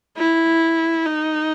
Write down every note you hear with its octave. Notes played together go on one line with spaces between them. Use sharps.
E4
D#4